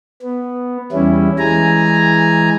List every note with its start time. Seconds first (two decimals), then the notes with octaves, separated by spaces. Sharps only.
0.22 B3
0.92 E2 G3 C#4 E4
1.39 E3 G#3 G#5 A#5